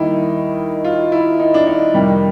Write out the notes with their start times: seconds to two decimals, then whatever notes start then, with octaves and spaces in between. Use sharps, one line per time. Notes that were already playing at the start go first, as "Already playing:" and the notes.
Already playing: D#2 D#3 G3 A#3 D#4 E4
0.84 F4
1.12 E4
1.40 D#4
1.54 D4
1.67 D#4
1.94 F2 C3 D#3 G3